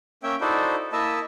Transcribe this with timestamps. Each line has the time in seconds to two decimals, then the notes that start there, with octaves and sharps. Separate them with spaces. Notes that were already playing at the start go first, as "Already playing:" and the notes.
0.23 A#3 C#4 C#5 E5 G5
0.41 D#4 E4 F#4 A4 C5 D5
0.93 A#3 E4 D#5 E5 A5